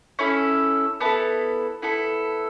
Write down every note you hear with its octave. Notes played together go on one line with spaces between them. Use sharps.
C#4 E4 A4
B3 E4 A4 A5
B3 E4 A4